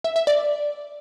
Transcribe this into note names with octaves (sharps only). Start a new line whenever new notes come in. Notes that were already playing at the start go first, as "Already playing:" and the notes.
E5
E5
D5